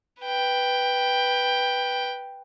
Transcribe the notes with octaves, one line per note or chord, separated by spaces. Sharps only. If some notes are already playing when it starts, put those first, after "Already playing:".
B4 G5